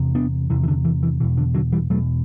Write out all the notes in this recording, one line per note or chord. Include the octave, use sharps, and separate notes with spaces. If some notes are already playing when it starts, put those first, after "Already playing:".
Already playing: E2 C3
B3 D4
E2 C3 E3
E3
D3
E3
E3
E2 B2 E3
D3
D3 F#3
E3 G3
E2 B2 F#3 A3